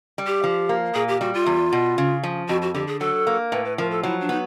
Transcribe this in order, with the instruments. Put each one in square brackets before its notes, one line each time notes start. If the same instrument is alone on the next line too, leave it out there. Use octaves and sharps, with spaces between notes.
[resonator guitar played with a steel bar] G3
[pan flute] G4
[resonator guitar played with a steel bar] F3
A#3
[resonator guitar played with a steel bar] A#2 [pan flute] G#4
[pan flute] G4
[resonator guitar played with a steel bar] G3 [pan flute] F#4
[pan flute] F4
[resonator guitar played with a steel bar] E2
B2
C#3
F3
[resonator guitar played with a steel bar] F2 [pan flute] F#4
[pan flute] F#4
[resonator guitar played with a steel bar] D3 [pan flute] G4
[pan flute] G#4
[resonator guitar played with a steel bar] F#3 [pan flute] A4
[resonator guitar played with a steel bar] A#3
[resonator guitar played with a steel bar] A2 [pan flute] B4
[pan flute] B4
[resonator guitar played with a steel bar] F3 [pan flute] A#4
[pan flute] A4
[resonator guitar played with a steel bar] F#3 [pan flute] E4
[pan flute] D4
[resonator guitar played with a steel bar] B3 [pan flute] D#4